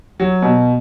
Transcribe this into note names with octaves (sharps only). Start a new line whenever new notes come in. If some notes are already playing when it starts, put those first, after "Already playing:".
F#3
B2